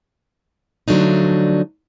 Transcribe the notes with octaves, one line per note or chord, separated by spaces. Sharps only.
D3 F3 F#3 A3 D4 D#4